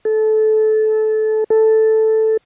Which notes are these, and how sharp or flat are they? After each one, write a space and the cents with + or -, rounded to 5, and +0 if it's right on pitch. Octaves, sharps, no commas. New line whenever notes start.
A4 -20
A4 +0